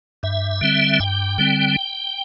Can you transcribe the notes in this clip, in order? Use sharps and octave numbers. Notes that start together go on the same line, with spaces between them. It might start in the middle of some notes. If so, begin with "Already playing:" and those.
G2 E5
D3 G3 C4
G2 G5
D3 G3 C4